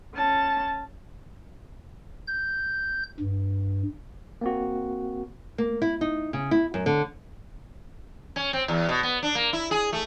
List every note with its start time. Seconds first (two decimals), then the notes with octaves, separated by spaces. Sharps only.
0.15 C#4 A5
2.27 G6
3.20 G2
4.41 A#3 C4 F#4
5.58 A#3
5.82 E4
6.01 D#4
6.33 C#3
6.51 E4
6.74 F#2
6.86 D3
8.36 C#4
8.53 C4
8.68 E2
8.89 B2
9.03 B3
9.23 D4
9.35 A#3
9.53 E4
9.71 G#4
9.93 A3